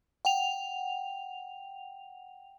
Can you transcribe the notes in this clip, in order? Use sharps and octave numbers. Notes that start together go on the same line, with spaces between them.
F#5 G5 F7